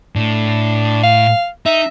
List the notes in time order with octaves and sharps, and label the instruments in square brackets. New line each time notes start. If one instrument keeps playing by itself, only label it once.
[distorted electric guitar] A2 [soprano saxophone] D4
[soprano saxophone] F5
[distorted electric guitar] D#4 [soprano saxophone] E5